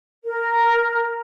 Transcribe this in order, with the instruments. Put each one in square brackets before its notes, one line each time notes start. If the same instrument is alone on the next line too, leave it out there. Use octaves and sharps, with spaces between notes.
[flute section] A#4